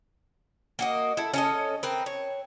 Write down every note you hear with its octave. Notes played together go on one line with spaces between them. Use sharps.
A#3 F#4 D#5
E4 A4
C#4 A4 D#5
C4 A#4 B4
C#5